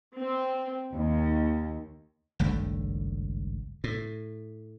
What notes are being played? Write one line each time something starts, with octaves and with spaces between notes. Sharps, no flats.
C4
D#2
G#1 C#2 G2 A3
A2